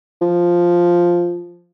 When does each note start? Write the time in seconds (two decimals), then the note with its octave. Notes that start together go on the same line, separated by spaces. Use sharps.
0.21 F3